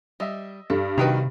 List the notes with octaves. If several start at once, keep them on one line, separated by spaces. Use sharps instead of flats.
G3 D#5 E5
G2 A4
C3 D#3 F#4 B4 D#5 G5 A#5